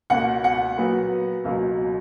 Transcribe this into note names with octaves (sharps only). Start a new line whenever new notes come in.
C#2 B2 A#3 F#5
F#5
A#2 F#3 B3
C#2 B2 F#3 A#3